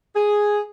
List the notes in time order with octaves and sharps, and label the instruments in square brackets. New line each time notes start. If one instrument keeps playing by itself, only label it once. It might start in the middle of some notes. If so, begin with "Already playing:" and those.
[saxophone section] G#4